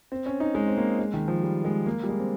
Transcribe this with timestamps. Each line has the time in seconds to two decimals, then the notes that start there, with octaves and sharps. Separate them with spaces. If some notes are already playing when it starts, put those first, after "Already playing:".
0.12 C4
0.26 C#4
0.40 D#4
0.55 G#3
0.68 C4
0.77 A#3
0.99 G#3
1.14 D#3
1.28 F3
1.43 G3
1.65 G#3
1.86 A#3
2.03 G3
2.09 G#3
2.19 C4